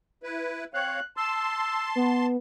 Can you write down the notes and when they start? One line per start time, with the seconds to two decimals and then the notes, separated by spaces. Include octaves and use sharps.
0.23 E4 B4
0.74 C4 C#5 F5 F#6
1.17 A5 C6 E6
1.96 B3